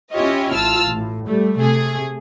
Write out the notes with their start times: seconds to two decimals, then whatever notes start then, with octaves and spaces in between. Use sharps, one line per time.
0.12 C#4 E4 F4 G4 C#5 D#5
0.53 A1 F4 A5 E6 F6
0.90 A2
1.26 G3 A3
1.58 C3 A3 G#4